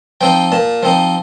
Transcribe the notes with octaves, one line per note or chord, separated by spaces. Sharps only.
F3 C4 D#4 G5
A#2 A5
F3 C4 D#4